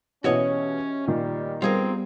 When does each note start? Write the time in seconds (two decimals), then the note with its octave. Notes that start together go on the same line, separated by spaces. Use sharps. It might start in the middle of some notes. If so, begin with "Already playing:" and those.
0.24 B2 E3 C#4 F#4 G4 C#5 D#5 E5
1.07 A#2 D#3 G3
1.62 G3 B3 C4 F4 G#4 A#4